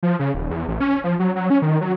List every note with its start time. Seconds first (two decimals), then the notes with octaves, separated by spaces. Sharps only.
0.03 F3
0.19 C#3
0.34 D#1
0.51 E2
0.68 A1
0.80 C#4
1.04 F3
1.19 F#3
1.36 F#3
1.50 C#4
1.62 D#3
1.81 F#3